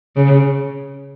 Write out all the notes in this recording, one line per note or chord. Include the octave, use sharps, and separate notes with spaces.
C#3